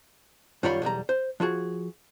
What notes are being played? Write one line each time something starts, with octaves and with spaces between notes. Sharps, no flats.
F#2 D#3 G3 F4 C#5 B5
B1 E2 G3 A#5
C5
F3 F4 F#4 G#4